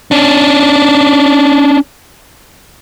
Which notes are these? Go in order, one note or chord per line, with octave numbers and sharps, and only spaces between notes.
C#4 D4